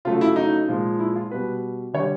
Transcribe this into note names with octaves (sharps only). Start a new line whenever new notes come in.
C#3 F#3 A3 F4
E4
D#4
A#2 F3 G#3
E4
F4
B2 G3 B4
D3 G3 C#5